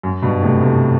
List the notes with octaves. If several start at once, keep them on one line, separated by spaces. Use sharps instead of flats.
F#2
G2 B2
A2 C3
A2 C3